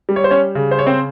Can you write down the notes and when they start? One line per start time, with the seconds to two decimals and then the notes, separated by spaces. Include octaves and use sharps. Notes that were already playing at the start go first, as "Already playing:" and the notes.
0.09 G3
0.16 C#5
0.24 C5
0.31 C#4 C#5
0.55 C#3
0.71 C5
0.79 C#5
0.86 C4 C5